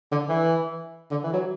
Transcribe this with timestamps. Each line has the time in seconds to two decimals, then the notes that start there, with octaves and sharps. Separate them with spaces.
0.12 D3
0.29 E3
1.11 D3
1.23 E3
1.33 F#3